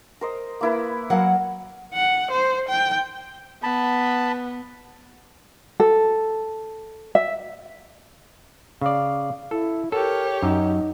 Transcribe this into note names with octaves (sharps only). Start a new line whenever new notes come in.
A#4 C5 D#5
A#3 E4 B4
F#3 A#4 F5 F#5 A5
F#5
C5
G5
B3 A5 B5
A4
E5
C#3 D5 F5
E4 A4
G4 A4 A#4 C#5
F#2 D#4